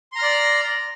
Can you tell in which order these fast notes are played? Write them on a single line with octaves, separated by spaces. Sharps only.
C6 A#5 F6 D5